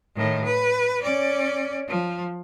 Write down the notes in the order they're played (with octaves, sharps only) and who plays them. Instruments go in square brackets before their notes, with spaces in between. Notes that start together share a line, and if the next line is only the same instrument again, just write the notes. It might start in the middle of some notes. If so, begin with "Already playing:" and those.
[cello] A2 D#3
B4
C#4 D5
F3